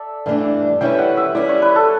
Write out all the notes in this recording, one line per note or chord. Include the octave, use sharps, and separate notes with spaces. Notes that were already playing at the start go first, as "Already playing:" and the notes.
Already playing: A4 D5 E5
G2 E3 A3 D4
E3 G3 C#4 E4 B4 G5
F#5
E5
G3 C#4 E4 D5
C#5
B4
A4